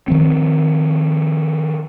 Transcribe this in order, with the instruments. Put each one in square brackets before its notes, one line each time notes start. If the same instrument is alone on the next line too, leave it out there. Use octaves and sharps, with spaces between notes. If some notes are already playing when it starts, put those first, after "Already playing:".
[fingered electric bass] D#3 F3 C4